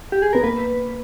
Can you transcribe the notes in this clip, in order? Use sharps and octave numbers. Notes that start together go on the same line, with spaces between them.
G4
G#4
B3 A#4
A#3 B4